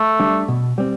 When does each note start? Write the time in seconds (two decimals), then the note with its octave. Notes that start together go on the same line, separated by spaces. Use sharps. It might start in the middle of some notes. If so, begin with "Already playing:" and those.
Already playing: A3
0.20 G3 D4
0.48 B2
0.78 G3 C4